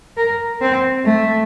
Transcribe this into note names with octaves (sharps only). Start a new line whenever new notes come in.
A#4
C4
A3